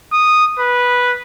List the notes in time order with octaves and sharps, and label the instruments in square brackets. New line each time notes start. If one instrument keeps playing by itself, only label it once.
[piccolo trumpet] D#6
B4